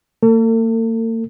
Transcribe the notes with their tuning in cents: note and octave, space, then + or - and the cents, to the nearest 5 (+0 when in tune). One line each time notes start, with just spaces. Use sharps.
A#3 -45 A4 +40